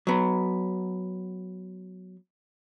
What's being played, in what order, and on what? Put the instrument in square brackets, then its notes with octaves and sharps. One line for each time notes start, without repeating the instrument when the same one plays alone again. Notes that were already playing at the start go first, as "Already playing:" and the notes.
[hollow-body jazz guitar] F#3 B3